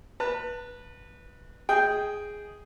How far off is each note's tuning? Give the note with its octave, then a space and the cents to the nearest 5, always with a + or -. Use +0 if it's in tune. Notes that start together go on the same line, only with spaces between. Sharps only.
B4 -15 A5 +35
G#4 +0 D#5 +20 G5 -5